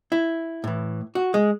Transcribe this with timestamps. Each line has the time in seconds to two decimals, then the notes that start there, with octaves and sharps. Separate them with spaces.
0.12 E4
0.64 A2 E3
1.15 F#4
1.34 G#3